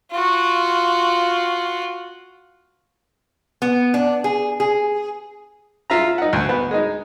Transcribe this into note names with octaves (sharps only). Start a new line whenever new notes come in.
F4 F#4
B3
D4
G#4
G#4
F4 E5 A#5
D#4 F#5
D2
B3
G#3 D#4